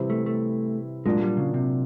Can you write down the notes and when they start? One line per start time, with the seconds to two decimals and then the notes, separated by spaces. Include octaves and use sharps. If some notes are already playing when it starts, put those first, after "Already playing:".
Already playing: C3 E3 G3 C4 E4
0.10 A3
0.26 A3
1.05 A#2 F#3 G#3 A#3 D4 F4
1.22 G3
1.37 C#3
1.54 C3